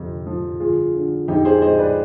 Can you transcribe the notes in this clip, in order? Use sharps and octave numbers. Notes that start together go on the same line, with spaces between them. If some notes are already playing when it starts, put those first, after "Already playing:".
Already playing: G1 F2 C3
F3
G1 F4 G#4
D3
F2 D#4 G4
G#4 C5
G#3 C5 D#5
B4 D5